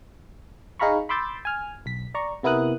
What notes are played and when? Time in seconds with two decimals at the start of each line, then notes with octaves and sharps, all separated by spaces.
0.79 D#4 G#4 F5 A#5 B5 C#6
1.09 B5 C6 D6 E6 G6 A6
1.45 G#5 F6
1.86 B1 B6
2.15 D5 A#5 C#6
2.43 C3 B3 E4 A#4 D#6 F#6